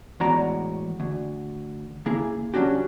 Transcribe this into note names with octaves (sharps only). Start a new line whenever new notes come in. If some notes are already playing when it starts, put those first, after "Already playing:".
E2 A2 G#3 F#4 D5 A#5
D2
C#3 A#3 E4 G#4
F#3 G3 C#4 D4 F#4 G4